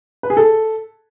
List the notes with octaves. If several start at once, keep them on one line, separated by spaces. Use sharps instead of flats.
B4
G#4
A4